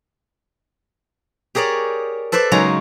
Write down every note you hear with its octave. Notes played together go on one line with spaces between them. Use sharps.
G4 G#4 A#4 C#5 D5
A4 B4 C5 D5 E5
C#3 F#3 G#3 D#4 C#5 A#5